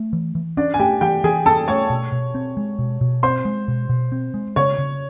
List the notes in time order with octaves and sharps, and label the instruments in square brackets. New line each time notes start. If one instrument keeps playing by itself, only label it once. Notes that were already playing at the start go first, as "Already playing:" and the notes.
Already playing: [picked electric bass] A3
E3
E3
[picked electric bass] C#4 [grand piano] D4 D5
[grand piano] G#5
[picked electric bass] A3 [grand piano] G4 G5
[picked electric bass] E3 [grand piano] G4 G5
[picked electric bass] E3 [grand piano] G#4 G#5
[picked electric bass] C#4 [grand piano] A4 A5
[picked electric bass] A3 [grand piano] C#5 C#6
[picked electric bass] B2
B2
C4
G#3
B2
B2
[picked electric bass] C4 [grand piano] C5 C6
[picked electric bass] G#3
B2
B2
C4
G#3
[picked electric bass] C#3 [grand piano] C#5 C#6
[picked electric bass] C#3